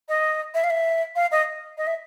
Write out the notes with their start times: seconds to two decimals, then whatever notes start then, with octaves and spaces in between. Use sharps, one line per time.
0.09 D#5
0.54 E5
0.64 F5
0.70 E5
1.16 F5
1.31 D#5
1.78 D#5
1.87 E5